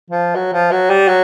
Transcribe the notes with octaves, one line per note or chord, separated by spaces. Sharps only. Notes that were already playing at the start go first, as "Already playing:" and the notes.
F3
F#3
F3
F#3
G3
F#3